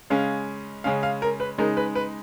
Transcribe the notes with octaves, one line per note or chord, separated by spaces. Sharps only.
C#3 G#3 C#4 F5
C#3 G#3 C#4 F5
F5
A#4
B4
C#3 G#3 D#4 A#4
B4
B4